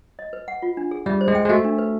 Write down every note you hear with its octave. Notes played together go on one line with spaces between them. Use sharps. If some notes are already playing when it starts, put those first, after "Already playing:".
D#5
B4
F#5
F4
D4
G#4
G3 E5
C5
G#3
G5
G#3
A3 F#4
D4
B4